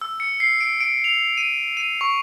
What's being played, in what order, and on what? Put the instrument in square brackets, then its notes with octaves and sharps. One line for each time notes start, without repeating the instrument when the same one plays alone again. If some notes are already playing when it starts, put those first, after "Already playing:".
[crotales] E6
C#7
C7
D7
D7
F7
D#7
D#7
C#6